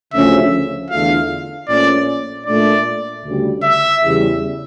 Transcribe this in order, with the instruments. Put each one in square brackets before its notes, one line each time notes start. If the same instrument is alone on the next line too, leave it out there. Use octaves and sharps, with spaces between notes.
[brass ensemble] D2 C#3 F3 C#4 [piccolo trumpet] E5
[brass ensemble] E2 D3 A3 D4 F4 [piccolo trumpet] F5
[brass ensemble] A#1 A#2 F3 A3 C#4 [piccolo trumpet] D5
[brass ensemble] A#2 A3 D4 [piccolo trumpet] D5
[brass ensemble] D2 C#3 G3
[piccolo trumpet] E5
[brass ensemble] E2 C#3 G3